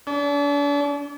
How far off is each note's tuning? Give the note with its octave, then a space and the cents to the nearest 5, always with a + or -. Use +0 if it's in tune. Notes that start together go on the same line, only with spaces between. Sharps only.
D4 -40